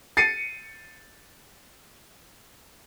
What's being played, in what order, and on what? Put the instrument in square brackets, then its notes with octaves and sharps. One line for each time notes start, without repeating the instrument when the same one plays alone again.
[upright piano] A6 C7 C#7 D#7